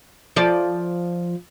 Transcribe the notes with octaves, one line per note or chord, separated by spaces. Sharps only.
F3 D5